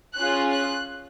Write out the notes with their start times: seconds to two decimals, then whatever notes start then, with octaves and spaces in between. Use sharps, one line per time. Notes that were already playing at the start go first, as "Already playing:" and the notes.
0.16 C#4 F4 G#4 F#6
0.51 F#6